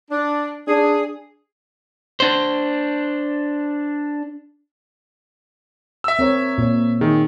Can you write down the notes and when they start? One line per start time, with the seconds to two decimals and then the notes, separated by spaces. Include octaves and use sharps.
0.11 D4
0.68 D4 G#4
2.20 D4 C5
6.04 E5 E6
6.19 C4 A#4 C#5
6.58 A#2 C#5
7.01 D#3 G#4